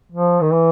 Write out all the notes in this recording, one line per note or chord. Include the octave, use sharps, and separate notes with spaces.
F3
D#3
E3